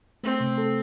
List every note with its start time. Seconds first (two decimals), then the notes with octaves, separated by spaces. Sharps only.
0.23 A3 C4
0.40 C3
0.58 A4